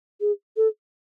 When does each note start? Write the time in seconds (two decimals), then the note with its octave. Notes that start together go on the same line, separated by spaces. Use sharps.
0.21 G#4
0.57 A4